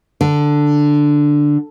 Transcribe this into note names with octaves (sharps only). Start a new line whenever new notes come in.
D3